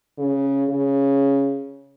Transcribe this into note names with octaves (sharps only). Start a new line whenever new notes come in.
C#3
C#3